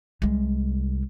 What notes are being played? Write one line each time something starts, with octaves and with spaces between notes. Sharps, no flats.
C2 G#3